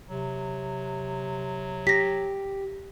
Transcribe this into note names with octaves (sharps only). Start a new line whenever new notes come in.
C3 F#3
G4 A#6 B6